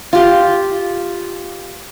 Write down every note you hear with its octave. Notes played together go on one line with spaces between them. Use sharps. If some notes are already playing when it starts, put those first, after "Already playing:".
F4 G4